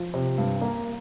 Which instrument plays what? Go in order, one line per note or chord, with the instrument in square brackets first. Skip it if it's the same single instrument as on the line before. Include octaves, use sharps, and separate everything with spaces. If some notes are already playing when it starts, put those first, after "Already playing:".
Already playing: [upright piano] F3
C3
G2
A#3